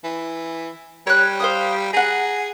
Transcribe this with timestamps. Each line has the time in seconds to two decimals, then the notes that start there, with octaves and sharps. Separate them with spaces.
0.04 E3
1.07 G3 C#5 F#6
1.40 C5 F5 D#6
1.93 G#4 F#5 A#5